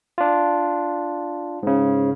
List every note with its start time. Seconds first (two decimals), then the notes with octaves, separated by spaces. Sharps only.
0.18 D4 F4
1.63 G#2 C#3